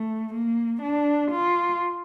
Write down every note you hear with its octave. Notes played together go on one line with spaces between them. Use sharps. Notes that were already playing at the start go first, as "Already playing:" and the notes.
Already playing: A3
A#3
D4
F4